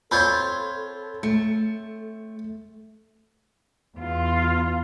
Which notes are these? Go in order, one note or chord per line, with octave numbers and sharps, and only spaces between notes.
C4 F4 A4 C#5 B5 G6 G#6
A3 C#7
E2 F4